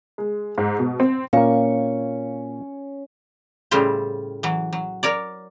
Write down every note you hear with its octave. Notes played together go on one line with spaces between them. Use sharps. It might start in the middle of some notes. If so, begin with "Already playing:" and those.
G#3
G#2
B2
C4
A#2 A#3 C#4 F5 C#6
A2 C#3 G3 E4 F4 C5
E3 F#3
F#3
A#4 C#5 D5